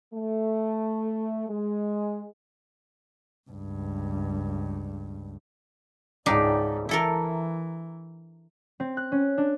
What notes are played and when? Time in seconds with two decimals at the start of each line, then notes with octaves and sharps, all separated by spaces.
0.13 A3
1.49 G#3
3.50 C#2 G2
6.26 C#2 G#2 D4 D#4 G4
6.89 E3 E4 A4 A#4
8.80 C4
8.97 F#6
9.12 C#4
9.38 D4